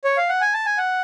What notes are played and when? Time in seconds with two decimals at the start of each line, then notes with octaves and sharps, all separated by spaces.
0.05 C#5
0.17 F5
0.29 F#5
0.41 G#5
0.54 A5
0.66 G#5
0.78 F#5